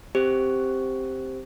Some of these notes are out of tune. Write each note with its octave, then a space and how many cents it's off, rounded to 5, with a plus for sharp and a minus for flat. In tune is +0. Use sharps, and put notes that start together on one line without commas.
C4 +5 G4 +0 C5 +0